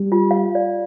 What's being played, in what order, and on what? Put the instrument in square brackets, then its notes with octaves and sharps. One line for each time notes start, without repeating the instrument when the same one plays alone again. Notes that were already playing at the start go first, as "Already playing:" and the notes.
Already playing: [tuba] G3
[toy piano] F4
F5
D5